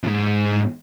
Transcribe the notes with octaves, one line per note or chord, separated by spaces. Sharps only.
F2 G#2